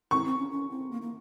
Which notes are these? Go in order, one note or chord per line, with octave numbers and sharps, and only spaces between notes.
C4 C#6
C4
C#4
C#4
C4
A#3
A#3